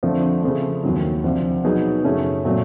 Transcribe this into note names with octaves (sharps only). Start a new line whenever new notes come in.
F2 D3 F3 A3
C#3 F3 A3
D#2 D#3 F#3
D2 C3 F3
B2 F#3 B3 D#4 G#4
F#2 C#3 F#3 A3 C#4
A#2 F#3 A3 C4